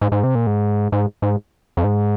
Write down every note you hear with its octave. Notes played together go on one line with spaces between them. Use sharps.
G#2
G#2
C3
A#2
G#2
G#2
G#2
F2
G#2